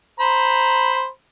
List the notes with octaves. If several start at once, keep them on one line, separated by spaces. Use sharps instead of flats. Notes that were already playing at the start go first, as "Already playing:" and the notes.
C5 A#5 B5